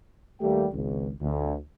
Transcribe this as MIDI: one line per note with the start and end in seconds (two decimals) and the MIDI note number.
0.41 0.66 39
0.41 0.66 55
0.41 0.66 57
0.41 0.66 58
0.41 0.66 67
0.41 0.66 79
0.73 1.10 32
0.73 1.10 37
1.22 1.55 38